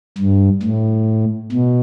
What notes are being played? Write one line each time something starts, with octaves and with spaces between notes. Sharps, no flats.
G2
A2
B2